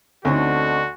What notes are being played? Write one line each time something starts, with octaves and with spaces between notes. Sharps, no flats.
D2 D3 C4 C#4 D#4 F#4